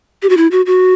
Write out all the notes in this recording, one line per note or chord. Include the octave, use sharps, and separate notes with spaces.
G4
F#4
E4
F#4
F#4